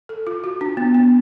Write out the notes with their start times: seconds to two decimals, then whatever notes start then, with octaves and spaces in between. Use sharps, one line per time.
0.09 A4
0.27 F4
0.44 F#4
0.61 D4
0.77 B3
0.95 B3